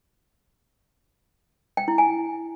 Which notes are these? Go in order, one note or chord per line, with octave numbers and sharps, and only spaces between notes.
G5
E4
G#5